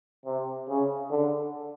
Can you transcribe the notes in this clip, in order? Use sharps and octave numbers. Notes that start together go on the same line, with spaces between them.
C3
C#3
D3